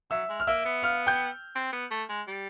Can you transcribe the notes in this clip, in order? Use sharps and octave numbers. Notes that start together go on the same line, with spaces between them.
F#3 E5 E6
G#3
F6
A#3 E5 E6
B3
F5 F6
G5 G6
C4
B3
A3
G#3
G3